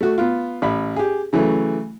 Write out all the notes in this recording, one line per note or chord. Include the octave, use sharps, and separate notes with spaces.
A3 F#4
B3 F4
A1 B5
G4 G#4
C#3 E3 F#3 A3